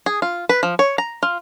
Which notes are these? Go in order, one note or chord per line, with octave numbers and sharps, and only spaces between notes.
G#4
F4
B4
F3
C#5
A#5
F4